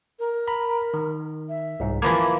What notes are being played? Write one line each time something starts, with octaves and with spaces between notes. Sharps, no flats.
A#4
A#5 B5
D#3
E5
C2 G#2
E3 F3 A#3 B5 G#6